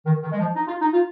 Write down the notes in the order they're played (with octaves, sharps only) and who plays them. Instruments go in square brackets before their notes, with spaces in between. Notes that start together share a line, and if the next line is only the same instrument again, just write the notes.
[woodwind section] D#3
D#3
G#3
F3
D#4
F4
D#4
F4